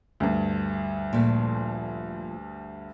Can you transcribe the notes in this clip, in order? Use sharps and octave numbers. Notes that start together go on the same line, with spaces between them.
D2 G2
A#2 F3 A3